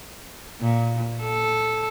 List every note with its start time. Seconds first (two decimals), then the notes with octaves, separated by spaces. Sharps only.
0.61 A#2
1.24 A4